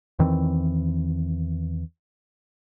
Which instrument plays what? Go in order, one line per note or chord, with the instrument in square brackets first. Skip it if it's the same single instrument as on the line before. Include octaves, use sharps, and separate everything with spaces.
[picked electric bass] E2 D#3 E3 C4